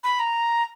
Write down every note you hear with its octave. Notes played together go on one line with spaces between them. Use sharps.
B5
A#5